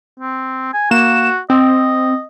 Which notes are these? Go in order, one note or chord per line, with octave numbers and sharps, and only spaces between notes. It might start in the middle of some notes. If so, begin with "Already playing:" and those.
C4
G#5
A#3 F#4 E7
C4 D#5